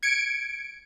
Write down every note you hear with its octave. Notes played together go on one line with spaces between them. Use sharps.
G#6 C#7 D7